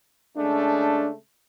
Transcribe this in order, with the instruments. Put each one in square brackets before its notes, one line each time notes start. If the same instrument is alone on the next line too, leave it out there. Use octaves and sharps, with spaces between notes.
[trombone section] C#3 G#3 A3 [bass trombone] D4